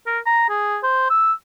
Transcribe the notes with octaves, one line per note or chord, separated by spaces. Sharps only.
A#4
A#5
G#4
C5
E6